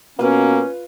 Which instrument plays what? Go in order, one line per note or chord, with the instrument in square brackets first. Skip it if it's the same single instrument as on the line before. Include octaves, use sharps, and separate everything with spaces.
[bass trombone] B2 [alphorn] A#3 [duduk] C#4 [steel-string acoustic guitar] F4 B4 F5